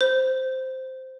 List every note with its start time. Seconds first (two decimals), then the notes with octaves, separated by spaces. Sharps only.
0.01 C5